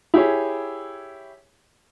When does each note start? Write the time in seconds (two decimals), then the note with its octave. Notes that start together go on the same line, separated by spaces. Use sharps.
0.14 E4 G4 G#4 C#5